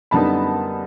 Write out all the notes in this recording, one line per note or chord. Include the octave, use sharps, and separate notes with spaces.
F#2 D3 G3 B3 D#4 A5 B5